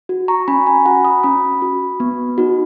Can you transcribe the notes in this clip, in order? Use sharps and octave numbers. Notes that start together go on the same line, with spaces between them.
F#4
A#5 C#6
C#4 G#5 B5
G#5 B5
F#4 F#5 A#5
B5 D#6
C#4 B5 D#6
F#4
B3
D#4 F#4